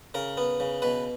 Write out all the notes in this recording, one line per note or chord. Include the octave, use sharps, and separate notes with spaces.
C#3 A#4
B3
C#3
B2 B4